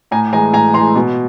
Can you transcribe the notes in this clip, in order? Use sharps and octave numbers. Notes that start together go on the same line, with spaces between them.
A2 G#5 A#5
E3 G#3 G#5 A#5
A2 G#5 A#5
E3 G#3 A#5 C6
B2